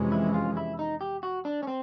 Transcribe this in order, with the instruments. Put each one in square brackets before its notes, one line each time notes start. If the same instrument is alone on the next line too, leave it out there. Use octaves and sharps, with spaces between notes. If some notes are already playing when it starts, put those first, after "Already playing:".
Already playing: [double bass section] F2 C3 E3 G#3 C#4
[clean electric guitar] E4
F4
E4
D#4
G4
F#4
D4
C#4
C4